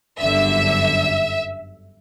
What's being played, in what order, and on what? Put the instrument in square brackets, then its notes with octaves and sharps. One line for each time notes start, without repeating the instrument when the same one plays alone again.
[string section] G1 F#2 D3 E5